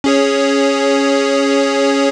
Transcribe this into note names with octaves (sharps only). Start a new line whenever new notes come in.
C#4 G#4 C#5